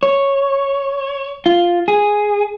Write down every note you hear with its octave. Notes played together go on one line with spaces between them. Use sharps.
C#5
F4
G#4